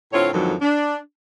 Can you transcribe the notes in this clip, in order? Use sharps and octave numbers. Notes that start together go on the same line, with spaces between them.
A2 D3 C4 F4 C#5
F2 G#2 D3 D#3 F3 F#3
D4